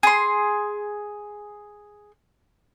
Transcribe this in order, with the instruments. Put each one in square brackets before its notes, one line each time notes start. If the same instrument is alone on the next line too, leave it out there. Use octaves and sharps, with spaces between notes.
[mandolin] G#4 C6